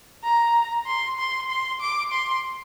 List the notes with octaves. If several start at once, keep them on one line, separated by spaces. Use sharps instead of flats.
A#5
C6
C6
C6
D6
C6